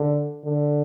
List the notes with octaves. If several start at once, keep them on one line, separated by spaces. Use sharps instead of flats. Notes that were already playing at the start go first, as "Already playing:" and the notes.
Already playing: D3
D3